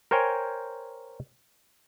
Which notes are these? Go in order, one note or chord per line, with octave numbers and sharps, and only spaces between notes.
A#4 C5 C#5 G5 G#5